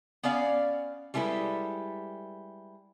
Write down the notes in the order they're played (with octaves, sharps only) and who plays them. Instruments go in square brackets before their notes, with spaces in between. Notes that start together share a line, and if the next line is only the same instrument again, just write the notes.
[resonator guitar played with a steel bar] B3 C#4 D5 F5
G3 G#3 E4 A4 B4